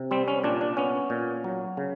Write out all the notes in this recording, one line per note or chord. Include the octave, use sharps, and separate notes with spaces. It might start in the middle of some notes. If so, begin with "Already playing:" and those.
Already playing: C3
G3 C4
C#4
A#2 D4
D4
B3 C#4
A#2
F#3
C#3